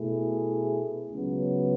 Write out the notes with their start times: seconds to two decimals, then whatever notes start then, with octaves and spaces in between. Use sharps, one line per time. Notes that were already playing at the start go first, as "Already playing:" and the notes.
Already playing: B2 A3 E4 G#4
1.12 C#2 C#3 F#3 B3